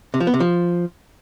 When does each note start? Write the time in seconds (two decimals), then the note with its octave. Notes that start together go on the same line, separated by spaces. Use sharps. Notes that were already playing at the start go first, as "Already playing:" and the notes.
0.14 C3
0.20 F3
0.27 B3
0.34 C3
0.40 F3